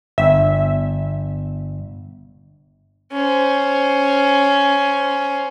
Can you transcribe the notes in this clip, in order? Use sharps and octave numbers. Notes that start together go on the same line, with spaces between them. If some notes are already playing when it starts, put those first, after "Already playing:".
G1 E5
C#4 C5